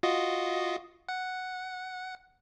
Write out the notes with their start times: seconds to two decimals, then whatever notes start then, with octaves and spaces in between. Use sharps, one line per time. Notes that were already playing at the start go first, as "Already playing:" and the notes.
0.03 F4 F#4 D#5
1.09 F#5